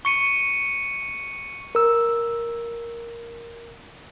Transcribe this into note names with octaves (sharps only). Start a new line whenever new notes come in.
C#6 C#7 D#7
A#4 E6